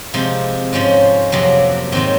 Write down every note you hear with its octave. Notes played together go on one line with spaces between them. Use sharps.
C3 F3 G#3 D#4
G#2 F3 G#3 C#4
F2 C3 F#3 A#3
G#2 D#3 F#3 C4